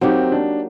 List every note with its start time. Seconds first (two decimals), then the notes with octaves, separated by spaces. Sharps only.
0.01 F#3 A#3 C4 D#4 G4
0.32 D4